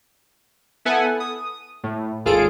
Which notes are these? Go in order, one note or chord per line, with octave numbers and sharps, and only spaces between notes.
B3 E4 A4 B4 F#5 G#5
D#6
A2
G#1 D#2 F4 G#4 A4 D7